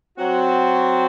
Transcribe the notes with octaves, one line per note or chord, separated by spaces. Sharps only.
F#3 C4 F#4